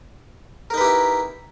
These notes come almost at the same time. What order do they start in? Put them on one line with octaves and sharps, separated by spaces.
A#4 D#4 B4 G4 E4